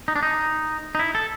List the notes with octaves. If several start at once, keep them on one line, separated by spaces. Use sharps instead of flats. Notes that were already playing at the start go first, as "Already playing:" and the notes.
D#4
D4
D#4
D#4
E4
A4